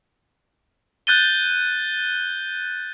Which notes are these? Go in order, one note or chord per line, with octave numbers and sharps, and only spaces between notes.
F#6 G6 A6 D#7 G7